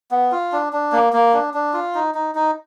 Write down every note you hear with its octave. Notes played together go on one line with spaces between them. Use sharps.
B3
F4
D4
D4
A#3
A#3
D4
D4
F4
D#4
D#4
D#4